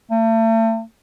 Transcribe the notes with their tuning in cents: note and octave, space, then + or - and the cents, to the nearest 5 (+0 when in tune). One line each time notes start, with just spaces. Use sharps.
A3 +40